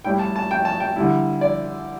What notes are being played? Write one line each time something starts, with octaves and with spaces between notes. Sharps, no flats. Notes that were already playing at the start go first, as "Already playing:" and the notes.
A2 G3 E4 G5
A5
A5
G5
A5
G5
D3 G3 E4
D5